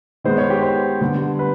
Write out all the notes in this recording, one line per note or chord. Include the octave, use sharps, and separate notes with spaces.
D#3 G#3 B3 C5
C#5
G4
C5
D3 G3 B3
B4